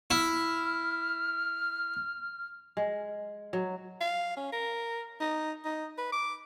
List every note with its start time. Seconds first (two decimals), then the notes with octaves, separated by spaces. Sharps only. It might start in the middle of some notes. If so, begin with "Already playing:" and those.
0.11 E4 F6
2.77 G#3
3.53 F#3
4.01 F5
4.37 C#4
4.52 A#4
5.20 D#4
5.65 D#4
5.98 B4
6.12 D6